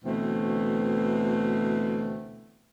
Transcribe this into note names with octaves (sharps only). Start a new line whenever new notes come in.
D2 B2 E3 A3 C4